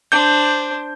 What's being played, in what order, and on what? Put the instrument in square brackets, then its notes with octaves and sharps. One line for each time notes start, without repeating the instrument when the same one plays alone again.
[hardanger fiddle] D4 C5 [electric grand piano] G6